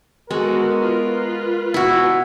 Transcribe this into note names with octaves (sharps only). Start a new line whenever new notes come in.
G#3 B3 F#4 A4 A#4
F4 B4
B2 E4 F#4